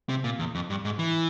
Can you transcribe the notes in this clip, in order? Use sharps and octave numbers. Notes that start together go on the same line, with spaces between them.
C3
A#2
E2
F2
G2
G#2
E3